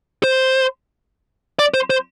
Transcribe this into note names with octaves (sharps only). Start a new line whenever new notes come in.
C5
D5
C5
C5